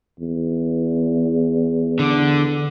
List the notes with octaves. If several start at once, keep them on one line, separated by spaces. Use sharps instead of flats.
E2
D3